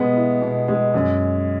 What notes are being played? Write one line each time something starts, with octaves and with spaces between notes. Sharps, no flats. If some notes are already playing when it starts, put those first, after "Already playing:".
Already playing: B2 G#3 B3
E4
B2
G#3
F#2